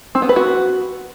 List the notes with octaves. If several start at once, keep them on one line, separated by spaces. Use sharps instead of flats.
C4
B3
B4
F#4